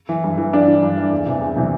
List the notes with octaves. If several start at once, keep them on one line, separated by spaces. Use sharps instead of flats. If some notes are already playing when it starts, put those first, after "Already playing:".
E3
G2
E3
G2 D4
E3
G2
E3
E2
C3 E3
E2
C3 E3